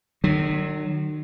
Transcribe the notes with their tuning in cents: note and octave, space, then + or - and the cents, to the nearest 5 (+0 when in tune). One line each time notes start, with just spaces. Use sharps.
D#3 -40 F#3 +15